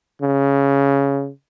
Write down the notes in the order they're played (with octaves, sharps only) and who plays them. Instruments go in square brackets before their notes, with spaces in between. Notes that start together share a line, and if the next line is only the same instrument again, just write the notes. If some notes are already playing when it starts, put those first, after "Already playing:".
[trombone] C#3